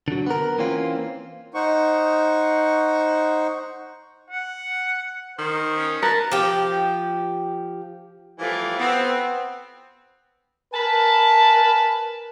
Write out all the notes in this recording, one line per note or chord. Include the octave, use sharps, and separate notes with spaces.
D3 F#3
B3 A#4
E3 A#3 C4 C#4 F4
D#4 C5 F#5 C#6
F#5
D#3 C5
C#4
A#4 B4 A5
F3 G4
E3 F3 G3 A3 A#3 F4
B3 C4
A#4 B4 G#5 A5